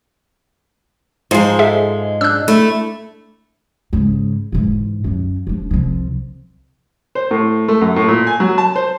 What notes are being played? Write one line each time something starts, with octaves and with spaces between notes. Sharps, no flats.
G#2 F3 G#3 D#4 C5 C6 C7
G#4 A4 E5
D4 E6 F#6
A3 E4
G#2 C#3
G#2 E3
F#2 F#3
F3 D4
C2 F3
C5
A2
A3
F#2
A2
A#2
G#5
F#3
A5
C5